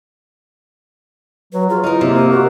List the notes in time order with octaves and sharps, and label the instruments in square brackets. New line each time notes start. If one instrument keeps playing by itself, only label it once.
[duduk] F#3 [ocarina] B4
[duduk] F4 [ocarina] G#4
[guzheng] D#4 A#4 [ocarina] E4
[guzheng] C3 [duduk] A#3
[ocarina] C5
[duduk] F#4 [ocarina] A#4